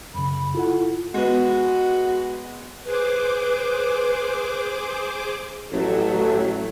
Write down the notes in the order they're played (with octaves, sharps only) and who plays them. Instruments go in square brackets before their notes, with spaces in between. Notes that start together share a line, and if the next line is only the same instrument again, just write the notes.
[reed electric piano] F#2 C#3 [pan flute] B5
[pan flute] E4 [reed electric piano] F4 A4 F#5
[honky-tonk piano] G#3 B3 [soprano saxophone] F#4
[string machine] G#4 C5 D6 [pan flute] B4
[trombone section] A1 [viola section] F#3 A3